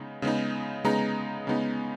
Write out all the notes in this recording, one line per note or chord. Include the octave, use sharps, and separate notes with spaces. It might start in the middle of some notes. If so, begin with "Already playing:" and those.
Already playing: C#3 G#3 B3 D#4
C#3 G#3 B3 D#4
C#3 G#3 B3 D#4 A#5
C#3 G#3 B3 D#4